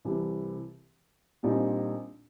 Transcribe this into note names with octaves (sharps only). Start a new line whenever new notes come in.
C2 C3 E3
A#1 A#2 G3 C4 D#4